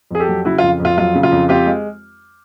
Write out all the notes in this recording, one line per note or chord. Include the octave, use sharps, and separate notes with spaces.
F2 G#4
G4 A4
F#3
C#3 E4 F#4
F4
F2
F2
F4
F#3 F4
C#3
F4
F2
C4 F4 G4
G#3